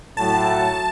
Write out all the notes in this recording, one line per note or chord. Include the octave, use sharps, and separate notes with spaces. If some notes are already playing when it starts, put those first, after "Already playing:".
A2 F#3 A5